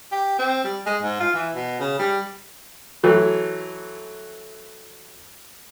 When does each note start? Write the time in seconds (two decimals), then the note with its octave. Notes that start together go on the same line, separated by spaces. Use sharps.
0.12 G4
0.39 C4
0.64 G3
0.86 G#3
1.02 G#2
1.20 F4
1.34 E3
1.55 B2
1.80 C#3
1.99 G3
3.03 E3 F#3 A3